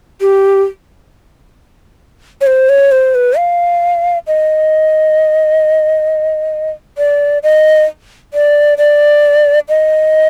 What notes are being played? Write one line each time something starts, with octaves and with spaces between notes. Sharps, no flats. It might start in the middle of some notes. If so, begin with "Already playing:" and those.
G4
C#5
C5
C#5
C5
B4
F5
D#5
D5
D#5
D5
D5
D#5